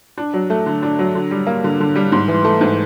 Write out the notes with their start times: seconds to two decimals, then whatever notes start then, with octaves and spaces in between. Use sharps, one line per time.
0.18 D4
0.34 F#3
0.50 A3
0.66 D3
0.83 D4
0.99 F#3
1.15 D3
1.31 G3
1.47 A#3
1.64 D3
1.80 D3
1.95 G3
2.12 G#2
2.28 E3
2.44 A3
2.61 G#2